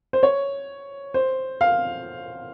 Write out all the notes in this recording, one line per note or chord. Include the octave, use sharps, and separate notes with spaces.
C5
C#5
C5
F5